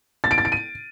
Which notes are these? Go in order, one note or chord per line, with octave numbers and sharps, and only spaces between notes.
A6
D7
A6
D7
D#7